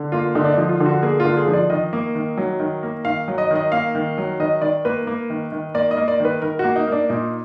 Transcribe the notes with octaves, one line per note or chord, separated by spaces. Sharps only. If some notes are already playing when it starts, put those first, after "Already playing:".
Already playing: D3
A#3 F4
D3 D#4
D4
D#4
F3
F4
D3
F#4
A#3 G#4
F4
D3
G#4
F3
D5
D#3 D#5
A#3
D#3
F#3
D#3
A#3
D#3 F5
F#3
D#5
D#3
D#5
A#3 F5
D#3
F#3
D#3 D#5
D#3 D5
A#3 B4
A#3
D#3
D#3
A#3 D5
D#5
A#3
D5
D#3 B4
D#3 A#4
A#3 F#4
D#4
A#3 D4
A#2 D#4